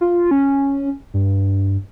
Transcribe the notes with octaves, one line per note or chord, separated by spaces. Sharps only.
F4
C#4
G2